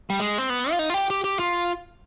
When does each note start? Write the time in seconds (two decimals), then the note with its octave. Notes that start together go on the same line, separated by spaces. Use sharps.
0.10 G3
0.20 G#3
0.38 C4
0.50 B3
0.71 F4
0.79 D#4
0.90 F4
0.94 G4
1.10 G4
1.24 G4
1.39 F4